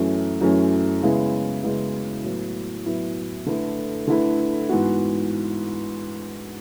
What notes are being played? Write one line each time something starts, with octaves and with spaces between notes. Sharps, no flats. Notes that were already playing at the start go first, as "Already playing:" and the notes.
Already playing: F#2 E3 A3 C#4
F#2 E3 A3 C#4
C#3 G#3 B3 E4
C#3 G#3 B3 E4
A2 F#3 B3 E4
A2 F#3 B3 E4
D3 A3 E4 B4
D3 A3 E4 B4
G#2 E3 B3 F#4